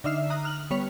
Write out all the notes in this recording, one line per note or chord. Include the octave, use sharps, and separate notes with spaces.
D3 D4 D#4 E5 F6 C7
A#5 D#6 F#6
F6 F#7
G3 B3 C#5 C#6 B6 F7